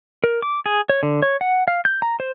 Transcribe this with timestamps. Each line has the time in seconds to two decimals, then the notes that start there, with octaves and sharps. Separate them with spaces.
0.24 A#4
0.42 D6
0.66 G#4
0.89 C#5
1.03 D3
1.22 C#5
1.41 F#5
1.68 F5
1.85 G6
2.02 A#5
2.20 C5